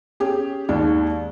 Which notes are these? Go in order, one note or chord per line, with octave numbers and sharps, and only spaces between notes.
C#4 G4 G#4
D#2 G#3 D4